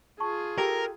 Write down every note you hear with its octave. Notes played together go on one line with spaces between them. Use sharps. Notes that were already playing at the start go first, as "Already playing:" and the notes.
F4 G#4 A5 C#6
G4 A4 A#4 A#5